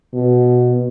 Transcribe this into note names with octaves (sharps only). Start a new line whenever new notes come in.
B2